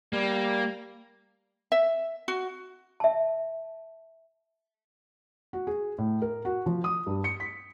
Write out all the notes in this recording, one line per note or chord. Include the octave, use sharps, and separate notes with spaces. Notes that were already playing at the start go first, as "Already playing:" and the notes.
G3 A#3
E5
F#4
E5 A5
F#4
G#4
A2
A#4
F#4
F3
D#6
G2
C#7
B6